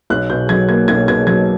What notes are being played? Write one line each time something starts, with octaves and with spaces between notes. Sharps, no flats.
B1 F#6
B2 G6
F#3 G#6
A#3 G#6
B1 G#6
B2 G#6
F#3 G#6